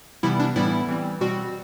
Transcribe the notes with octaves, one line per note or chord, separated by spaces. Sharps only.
C3 E3 G3 B3 E4
D4
A2 E3 G3 B3 E4
E3 G3 C4
B2 G3 C4 F#4